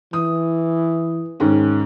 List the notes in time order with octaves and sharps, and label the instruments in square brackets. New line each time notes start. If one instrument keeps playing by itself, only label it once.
[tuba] E3 [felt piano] D#6
[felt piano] G#2 D#3 C#4